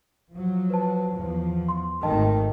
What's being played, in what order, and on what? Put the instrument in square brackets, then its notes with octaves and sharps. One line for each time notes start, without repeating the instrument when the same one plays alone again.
[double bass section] F3 F#3
[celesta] B4 C5 A5
[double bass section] E2 F3
[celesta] C6
[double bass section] G#1 D#3 A3 [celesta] D#5 G5 A5